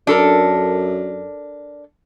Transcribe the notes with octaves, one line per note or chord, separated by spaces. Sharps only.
F#2 D4 A4 A#4